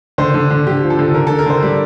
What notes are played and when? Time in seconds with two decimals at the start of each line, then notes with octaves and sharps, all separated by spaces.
0.18 D3 C5
0.34 D3
0.50 D3
0.67 D3 G4
0.83 F3
0.90 A4
0.99 D3
1.14 D3 A#4
1.27 D3 A4
1.39 A#4
1.46 D3 C5
1.63 G3 D5